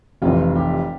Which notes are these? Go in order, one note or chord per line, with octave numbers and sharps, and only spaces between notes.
F1 F2 E3 F4
G4